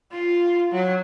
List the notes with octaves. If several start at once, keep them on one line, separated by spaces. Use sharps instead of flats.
F4
F#3